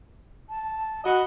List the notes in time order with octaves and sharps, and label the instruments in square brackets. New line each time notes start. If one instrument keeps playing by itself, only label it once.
[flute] A5
[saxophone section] F#4 D#5 [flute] B5